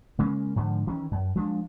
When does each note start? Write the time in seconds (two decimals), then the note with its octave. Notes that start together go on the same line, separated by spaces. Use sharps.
0.19 C#3 G#3 A#3 C#4
0.56 G#2 D3 F3
0.87 D#3 E3 C#4
1.11 F#2
1.35 F3 G#3 A#3 D4